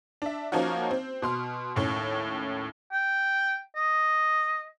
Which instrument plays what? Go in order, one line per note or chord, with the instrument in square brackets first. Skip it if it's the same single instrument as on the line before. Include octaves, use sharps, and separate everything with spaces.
[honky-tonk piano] D4 E5
F3 A#3 C#4 D#4 F#4
C4
B2 C6 F6
D#2 A2 C#4
[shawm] G5
D#5